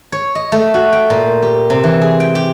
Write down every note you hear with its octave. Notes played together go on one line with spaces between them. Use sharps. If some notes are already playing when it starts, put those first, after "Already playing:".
C#5
D#5
A3
F#4
G5
A#2
G4
C3
E3
G#4
G5
G4